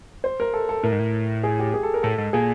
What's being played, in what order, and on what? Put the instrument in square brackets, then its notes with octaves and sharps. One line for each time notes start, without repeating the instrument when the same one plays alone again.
[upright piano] C5
A#4
A4
A4
[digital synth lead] A2 [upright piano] A#4
[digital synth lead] G#2
A2
[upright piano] G#4
G4
G#4
A4
A#4
[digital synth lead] A2 [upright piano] A4
[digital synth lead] G#2
[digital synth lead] A#2 [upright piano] G#4